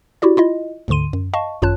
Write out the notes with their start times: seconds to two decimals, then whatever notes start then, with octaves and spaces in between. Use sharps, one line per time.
0.22 E4 F#4 G4 D5
0.37 E4 F4 D#5
0.88 D2 G#2 D3 C6 D#7
1.13 F#2
1.34 D#5 F5 A5 C#6
1.62 G#1 F#2 F4 C#5 A5 F#6